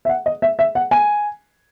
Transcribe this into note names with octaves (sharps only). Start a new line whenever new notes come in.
E5
F#5
D#5
E5
E5
F#5
G#5